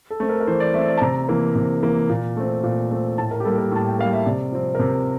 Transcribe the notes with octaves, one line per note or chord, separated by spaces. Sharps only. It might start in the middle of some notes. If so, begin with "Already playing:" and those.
A4
A3 C4
A#4
A#4
E3 C5
D5
A3 C4 E5
D5
A5
C3 A#5
E3 A#3
C3
E3 A#3
A#2
A3 C4
A#2
A3 C4
A2 A5
A#4
G4
G3 A#3 A4
A#4
A2 A5
G5
G3 A#3 F5
E5
C3 D5
F3 C4
A#4
C3 C5